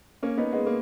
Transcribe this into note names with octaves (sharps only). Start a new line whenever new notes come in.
A#3 C#4
B3 D#4
G#3 B3
A#3